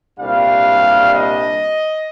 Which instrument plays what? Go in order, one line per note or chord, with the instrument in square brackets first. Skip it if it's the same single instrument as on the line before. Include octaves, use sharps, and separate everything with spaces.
[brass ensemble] C2 A#2 G3 D4 F5
D#5